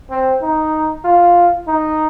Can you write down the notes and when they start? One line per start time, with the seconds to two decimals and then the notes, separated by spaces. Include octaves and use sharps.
0.10 C4
0.42 D#4
1.04 F4
1.68 D#4